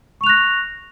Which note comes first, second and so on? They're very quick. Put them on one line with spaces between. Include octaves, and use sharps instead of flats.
C#6 F7 F#6 A#6